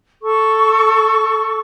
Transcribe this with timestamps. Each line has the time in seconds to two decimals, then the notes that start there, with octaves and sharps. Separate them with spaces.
0.22 A4 C#6